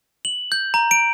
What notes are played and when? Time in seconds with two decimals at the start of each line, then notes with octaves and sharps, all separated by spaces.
0.25 F#7
0.52 G6
0.74 A#5
0.91 D7